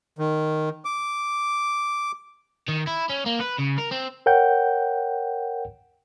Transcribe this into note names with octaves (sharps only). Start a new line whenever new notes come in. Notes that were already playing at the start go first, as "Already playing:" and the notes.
D#3
D6
D#3
E4
C#4
A#3
B4
C#3
A#4
C4
A#4 C#5 F#5 G5 G6